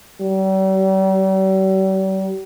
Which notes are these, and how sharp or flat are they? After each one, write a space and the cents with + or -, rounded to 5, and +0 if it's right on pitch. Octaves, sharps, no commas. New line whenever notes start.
G3 -45